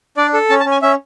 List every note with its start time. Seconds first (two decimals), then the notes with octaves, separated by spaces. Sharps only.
0.17 D4 D5
0.34 A4
0.49 C#4 A5
0.60 A5
0.66 C#4
0.71 G#5
0.82 C#4 E5